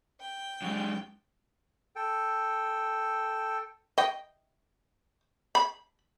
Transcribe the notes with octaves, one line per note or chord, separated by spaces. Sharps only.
G5
F#2 G#3
A4 G5
D#5 G5
B5